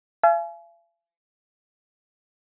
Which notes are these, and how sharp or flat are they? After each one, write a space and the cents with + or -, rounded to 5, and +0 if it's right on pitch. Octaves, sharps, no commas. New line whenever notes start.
F5 -45 G#5 +35